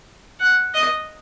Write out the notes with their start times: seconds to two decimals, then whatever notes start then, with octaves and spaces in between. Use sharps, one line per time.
0.40 F#5
0.74 D#5